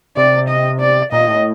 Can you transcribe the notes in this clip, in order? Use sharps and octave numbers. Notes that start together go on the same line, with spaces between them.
C3 D5
D#5
D5
A#2 D#5
A2